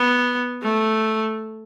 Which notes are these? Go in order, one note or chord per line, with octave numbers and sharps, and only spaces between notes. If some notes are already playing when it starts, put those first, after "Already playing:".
Already playing: B3
A3